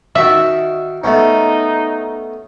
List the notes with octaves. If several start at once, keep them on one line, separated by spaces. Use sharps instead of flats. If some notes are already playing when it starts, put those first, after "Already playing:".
D#3 F#4 E5 A5
A3 B3 C#4 D#4